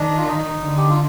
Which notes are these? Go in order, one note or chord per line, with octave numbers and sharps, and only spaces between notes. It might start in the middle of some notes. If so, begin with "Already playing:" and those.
Already playing: D#3 D4
F4
D#4
D3
G4
F4